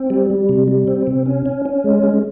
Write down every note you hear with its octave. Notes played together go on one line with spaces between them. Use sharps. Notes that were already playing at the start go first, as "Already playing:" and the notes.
Already playing: C4
G3
G3
C3
G3
C4
C3
C#4
C#4
C#4
G#3
G#3